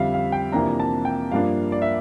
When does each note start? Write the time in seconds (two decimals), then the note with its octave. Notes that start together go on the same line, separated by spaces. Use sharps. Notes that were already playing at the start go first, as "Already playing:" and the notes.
Already playing: F2 D3 G3 E5 F5
0.14 F5
0.32 G5
0.52 F2 C3 E3 A#3 D4 A#5
0.80 A5
1.05 G5
1.32 G2 F3 A#3 D4 F5
1.72 D5
1.82 E5